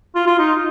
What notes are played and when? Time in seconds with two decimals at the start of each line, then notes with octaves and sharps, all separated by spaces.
0.15 F4
0.27 F4
0.38 D#4